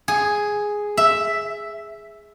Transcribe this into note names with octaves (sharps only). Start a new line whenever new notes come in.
G#4
E5